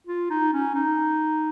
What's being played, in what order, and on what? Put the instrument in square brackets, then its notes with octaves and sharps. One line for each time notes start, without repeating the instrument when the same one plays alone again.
[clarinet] F4
D#4
C#4
D#4